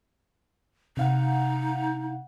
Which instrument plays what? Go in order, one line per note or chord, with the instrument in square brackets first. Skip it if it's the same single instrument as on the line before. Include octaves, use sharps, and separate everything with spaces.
[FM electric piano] C3 F5 F#5 [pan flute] D#4